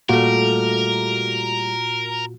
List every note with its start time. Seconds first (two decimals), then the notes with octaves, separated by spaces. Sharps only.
0.09 A#2 G3 A3 F4 F#4 A#4